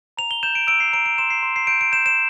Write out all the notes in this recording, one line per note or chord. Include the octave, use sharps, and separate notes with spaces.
A#5 F7
G7
G6 E7
D7
E6 D7
C7
A#5 D7
D7
C6 E7
C7
C6
C7
G6 D7
D7
G6 E7
E7